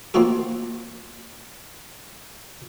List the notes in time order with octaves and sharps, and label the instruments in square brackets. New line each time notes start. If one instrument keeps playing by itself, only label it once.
[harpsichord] F3 A#3 C4 D#4 F#4 A4